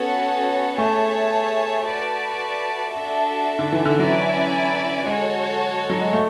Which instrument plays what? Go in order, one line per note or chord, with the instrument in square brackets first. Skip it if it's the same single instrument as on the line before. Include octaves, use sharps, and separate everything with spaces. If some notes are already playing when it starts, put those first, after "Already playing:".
Already playing: [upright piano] B3 [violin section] C#4 F#4 A4 C#5 F#5
[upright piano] A3 [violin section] G#4 C#5 E5 A5
[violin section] F#4 B4 D5 A5
D4 F#4 A4 E5
[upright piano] D3
E3
D3
[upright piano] F#3 [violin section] C#4 E4 B4 D5 G#5
[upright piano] G#3 [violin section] F#4 A4 C#5
[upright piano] F#3
G#3
A3